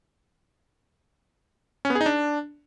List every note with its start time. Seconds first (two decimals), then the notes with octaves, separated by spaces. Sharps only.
1.85 C#4
1.90 B3
1.95 G#4
2.01 D#4
2.06 D4